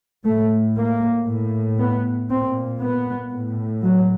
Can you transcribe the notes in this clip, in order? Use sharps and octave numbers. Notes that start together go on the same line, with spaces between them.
A2 A3
A#3
A2
B3
A#2 C4
B3
A2
F#3